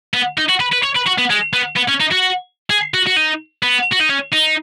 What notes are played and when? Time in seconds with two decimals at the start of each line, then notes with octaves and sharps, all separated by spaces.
0.14 B3
0.38 D#4
0.49 F#4
0.61 B4
0.73 B4
0.84 C#5
0.96 B4
1.07 F#4
1.19 B3
1.30 G#3
1.54 B3
1.77 B3
1.89 C#4
2.01 D#4
2.12 F#4
2.70 G#4
2.94 F#4
3.07 F#4
3.16 D#4
3.63 B3
3.93 F#4
4.01 D#4
4.10 C#4
4.33 D#4